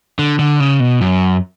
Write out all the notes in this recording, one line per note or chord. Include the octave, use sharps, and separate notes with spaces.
D3
D3
C#3
B2
F#2